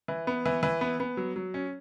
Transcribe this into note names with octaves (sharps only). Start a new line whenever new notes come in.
E3
B3
E3
E3
B3
B3
F#3
F#3
C#4